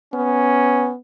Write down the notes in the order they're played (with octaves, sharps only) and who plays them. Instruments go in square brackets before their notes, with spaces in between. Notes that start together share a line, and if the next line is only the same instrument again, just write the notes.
[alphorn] B3 [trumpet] C#4